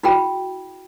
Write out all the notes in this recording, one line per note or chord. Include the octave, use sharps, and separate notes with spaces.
E4 F#4 G#4 G5 B5